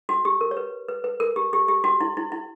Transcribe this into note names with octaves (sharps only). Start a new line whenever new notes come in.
F#4
G4
A#4
C#5
B4
B4
B4
A#4
G4
G4
G4
F#4
E4
E4
E4